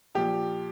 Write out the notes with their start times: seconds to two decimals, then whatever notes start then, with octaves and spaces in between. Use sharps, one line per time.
0.15 A#2 F3 G4